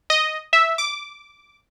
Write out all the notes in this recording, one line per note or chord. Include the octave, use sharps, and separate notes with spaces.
D#5
E5
D6